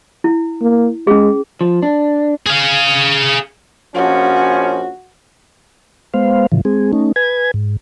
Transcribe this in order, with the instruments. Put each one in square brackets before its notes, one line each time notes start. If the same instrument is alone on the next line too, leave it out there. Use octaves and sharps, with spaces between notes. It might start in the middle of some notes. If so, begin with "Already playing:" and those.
[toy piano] E4
[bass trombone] A#3
[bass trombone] G#3 [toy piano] C#4 G#4
[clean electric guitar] F3
D4
[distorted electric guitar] G#4 F5
[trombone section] A#1 F3 C#4 [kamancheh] F#4
[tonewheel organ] G#3 B3 C5 F5
A2 C#3 E3 F3
G#3 C4 G#4
A3 C#4 D#4
B4 G#5 G#6
G#2